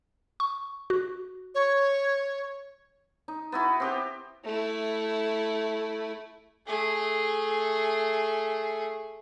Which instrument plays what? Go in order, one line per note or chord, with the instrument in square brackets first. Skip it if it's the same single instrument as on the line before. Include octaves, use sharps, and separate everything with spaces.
[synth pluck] C#6
F#4
[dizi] C#5
[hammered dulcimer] D#4
B3 E4 F#4
C4 G4 B4
[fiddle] A3 E4
A3 G#4